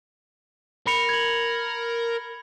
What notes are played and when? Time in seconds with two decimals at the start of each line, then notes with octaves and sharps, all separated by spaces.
0.87 A#4 B5 C#7 F7
1.09 G#6 F#7